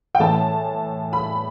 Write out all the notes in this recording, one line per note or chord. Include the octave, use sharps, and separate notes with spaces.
G5
A2 E3 A3 A5
B5